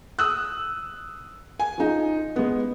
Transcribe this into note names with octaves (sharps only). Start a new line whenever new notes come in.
D#6 E6 F#6
G#5
F3 D#4
G#3 B3